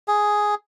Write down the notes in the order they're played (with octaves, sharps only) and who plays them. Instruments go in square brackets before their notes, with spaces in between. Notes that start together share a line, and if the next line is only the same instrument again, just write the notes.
[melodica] G#4